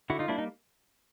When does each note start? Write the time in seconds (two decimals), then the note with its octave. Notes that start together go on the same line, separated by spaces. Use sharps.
0.10 D3 E4 F#4
0.19 D#4 F4
0.28 G3 A#3 D4 E4
0.38 D#4